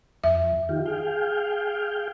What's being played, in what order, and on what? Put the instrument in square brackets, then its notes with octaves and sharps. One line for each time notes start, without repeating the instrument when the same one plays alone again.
[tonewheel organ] F2 [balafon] E5
[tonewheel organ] D#3 F4 G4
G#4 F5 G5